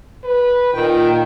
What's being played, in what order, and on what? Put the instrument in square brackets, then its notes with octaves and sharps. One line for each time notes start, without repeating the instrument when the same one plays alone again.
[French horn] B4
[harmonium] A#2 G5 [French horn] D#3